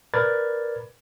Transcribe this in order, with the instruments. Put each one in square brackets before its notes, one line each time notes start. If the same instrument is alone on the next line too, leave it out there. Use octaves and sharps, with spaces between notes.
[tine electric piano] A#4 B4 D5 B5 G#6 A6